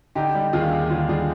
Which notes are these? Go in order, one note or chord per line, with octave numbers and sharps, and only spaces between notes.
D3 D#4 G4
G3
D#2 F4 G#4
D#2
D3 F4 G#4
G3 F4 G#4